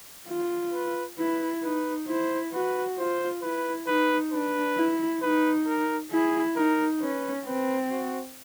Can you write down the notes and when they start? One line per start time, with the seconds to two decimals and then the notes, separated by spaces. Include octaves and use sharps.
0.29 F4
0.74 B4
1.18 E4 B4
1.63 D#4 B4
2.08 E4 C5
2.53 F#4 B4
2.98 F4 C5
3.42 E4 B4
3.87 D#4 B4
4.32 D4 B4
4.76 E4
5.22 D#4 B4
5.66 A#4
6.12 E4 G#4
6.56 D#4 A#4
7.01 C#4 B4
7.45 C4 B4
7.91 F#4